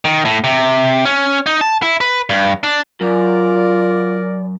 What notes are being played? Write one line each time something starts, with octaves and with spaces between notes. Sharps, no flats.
D#3
A2
C3
C#4
D#4
A5
E4
B4
G2
D4
F#2 F4 A#4 D5